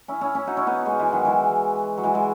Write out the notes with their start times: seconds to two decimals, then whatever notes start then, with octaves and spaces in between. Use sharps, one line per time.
0.08 C#4 E4
0.21 C#4 E4
0.35 C#4 E4
0.47 D#4 F#4
0.57 C#4 E4
0.67 B3 D#4
0.86 G#3 B3
1.00 E3 G#3
1.13 D#3 F#3
1.25 E3 G#3
1.97 F#3
2.04 E3 G#3
2.15 G#3